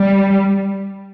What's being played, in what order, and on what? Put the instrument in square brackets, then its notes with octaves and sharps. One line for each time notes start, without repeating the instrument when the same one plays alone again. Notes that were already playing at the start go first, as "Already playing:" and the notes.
Already playing: [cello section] G3